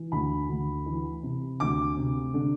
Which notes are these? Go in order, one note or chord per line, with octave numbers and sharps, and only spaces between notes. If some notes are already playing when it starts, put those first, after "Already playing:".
Already playing: E3
D2 B5
D2
E3
C3
D2 D6
C3
D3